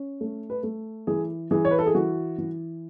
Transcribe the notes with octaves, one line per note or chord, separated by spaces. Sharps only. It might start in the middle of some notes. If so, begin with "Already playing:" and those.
Already playing: C#4
A3
B4
A3
E3 G#4
E3 G#4
C#5
B4
A4
G#4
E3 F#4
E3